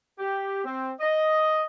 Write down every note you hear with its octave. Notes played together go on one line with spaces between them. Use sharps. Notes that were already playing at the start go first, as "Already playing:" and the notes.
G4
C4
D#5